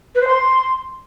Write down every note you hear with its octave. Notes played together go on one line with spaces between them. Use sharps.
B4
C5
C6